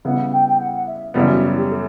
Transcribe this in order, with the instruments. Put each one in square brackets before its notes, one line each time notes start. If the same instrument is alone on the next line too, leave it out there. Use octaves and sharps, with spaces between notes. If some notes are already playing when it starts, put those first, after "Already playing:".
[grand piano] C#3 G3 B3 E4 [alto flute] F#5
[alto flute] G5
G5
F#5
F#5
E5
[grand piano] F#2 C#3 E3 G3 B3
[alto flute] F#4
E4
G4
A4